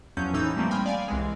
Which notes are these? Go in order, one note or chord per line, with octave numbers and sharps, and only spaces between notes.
E2 F3 F#3 C#4 G6
A2 E3 D#4 E6 G6
F3 G3 A3 A#3 C4
G5 G#5 B5 C6 D#6 F6
D5 F5 G#5
C2 E3 G#3